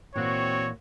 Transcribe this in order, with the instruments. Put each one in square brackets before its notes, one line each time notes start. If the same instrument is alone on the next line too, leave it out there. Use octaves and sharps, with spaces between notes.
[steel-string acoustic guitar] A#2 E3 [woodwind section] C4 F#4 [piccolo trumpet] C#5